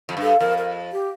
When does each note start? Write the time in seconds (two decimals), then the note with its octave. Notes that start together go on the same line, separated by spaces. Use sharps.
0.09 F2
0.17 G2
0.22 A4
0.40 F2 A#4
0.58 A#4
0.92 G4